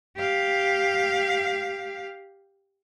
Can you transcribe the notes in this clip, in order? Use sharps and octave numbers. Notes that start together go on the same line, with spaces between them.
G4 F5